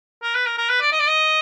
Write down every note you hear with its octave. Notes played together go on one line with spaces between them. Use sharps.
A#4
B4
A#4
A#4
B4
D5
D#5
D5
D#5